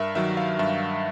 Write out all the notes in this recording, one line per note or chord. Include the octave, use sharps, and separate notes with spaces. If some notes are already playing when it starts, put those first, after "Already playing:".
Already playing: G2 A#4 E5
D#3 F#3 E5
F5
G2 E5